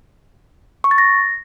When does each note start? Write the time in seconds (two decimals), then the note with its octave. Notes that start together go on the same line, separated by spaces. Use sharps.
0.84 C#6
0.91 A6
0.98 A#6